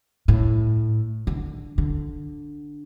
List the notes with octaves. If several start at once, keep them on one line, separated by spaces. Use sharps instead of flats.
A2
D3
D3